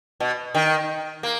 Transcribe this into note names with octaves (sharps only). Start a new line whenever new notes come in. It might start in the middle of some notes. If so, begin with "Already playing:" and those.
B2
D#3
A#3